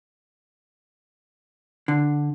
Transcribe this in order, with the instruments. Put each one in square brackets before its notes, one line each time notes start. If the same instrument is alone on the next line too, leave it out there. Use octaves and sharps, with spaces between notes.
[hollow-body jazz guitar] D3